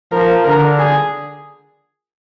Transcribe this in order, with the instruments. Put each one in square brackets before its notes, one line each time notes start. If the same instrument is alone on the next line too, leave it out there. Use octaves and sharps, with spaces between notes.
[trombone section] F3 [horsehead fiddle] A#4
[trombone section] D3 [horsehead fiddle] A#4
[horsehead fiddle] G#4